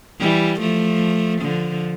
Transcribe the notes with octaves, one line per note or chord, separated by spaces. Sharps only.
E3 G3
F3 A3
D3 F3